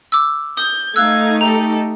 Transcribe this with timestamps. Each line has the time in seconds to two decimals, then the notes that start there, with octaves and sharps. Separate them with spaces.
0.12 D6 E6
0.57 D#6 G6
0.96 A3 D#4 F5 E6 F#6 G#6
1.41 G4 A4 A#5